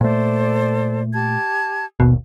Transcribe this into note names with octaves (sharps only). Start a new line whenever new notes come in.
A#2 A3 A4 C5 D5
G4 A5 G#6
G#1 D#2 B2